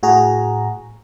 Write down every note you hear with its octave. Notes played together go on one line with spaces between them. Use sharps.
A2 F#4 G#4 A#5